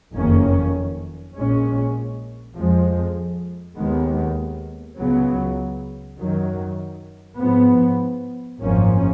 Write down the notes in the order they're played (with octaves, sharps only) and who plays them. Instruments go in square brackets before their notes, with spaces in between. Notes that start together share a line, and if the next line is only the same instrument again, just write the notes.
[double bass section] F#1 F2 D#3 A#3 C#4
A#1 A#2 G#3 C#4
F2 F3 G#3
D#2 D#3 G#3 B3
C#2 C#3 F#3 B3
F#2 D#3 F#3
G#2 F3 B3
G#1 F#2 F3 A#3 C#4